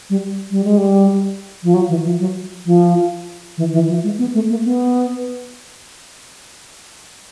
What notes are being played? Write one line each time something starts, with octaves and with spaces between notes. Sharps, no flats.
G3
G3
G#3
G3
F3
F#3
E3
F3
F#3
F3
E3
E3
F3
G#3
B3
A3
A#3
B3